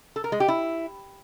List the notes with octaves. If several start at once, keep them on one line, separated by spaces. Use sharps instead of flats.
A4
A#4
G#3
G4
E4